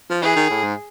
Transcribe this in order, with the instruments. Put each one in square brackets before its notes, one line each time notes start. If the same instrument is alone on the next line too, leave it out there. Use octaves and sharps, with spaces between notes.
[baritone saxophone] F3
[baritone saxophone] E3 [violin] G#4
[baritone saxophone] D#3
A2
G#2